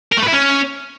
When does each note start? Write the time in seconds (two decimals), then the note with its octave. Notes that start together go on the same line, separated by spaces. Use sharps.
0.12 A#4
0.17 A3
0.22 B4
0.27 E4
0.33 C#4